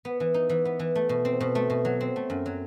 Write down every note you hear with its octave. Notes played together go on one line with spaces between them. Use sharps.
B3
E3
D#4
E3
B3
E3
A3
B2
C4
B2
A3
B2
F#3
C4
A3
F#2
F#3